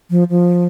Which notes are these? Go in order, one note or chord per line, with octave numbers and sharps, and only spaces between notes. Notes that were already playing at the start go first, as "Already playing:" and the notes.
F3
F3